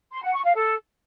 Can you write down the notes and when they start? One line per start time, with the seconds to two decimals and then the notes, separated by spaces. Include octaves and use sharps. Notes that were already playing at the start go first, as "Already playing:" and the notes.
0.13 C6
0.23 F#5
0.34 C#6
0.45 F5
0.55 A4